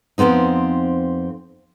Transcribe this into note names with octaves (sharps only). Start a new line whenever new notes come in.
F2 C#3 B3 C4 D#4